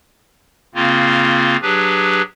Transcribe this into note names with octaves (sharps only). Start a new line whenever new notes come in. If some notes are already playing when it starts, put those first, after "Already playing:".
C#3 A#3 C4 F4
F#3 D4 G4 G#4 B4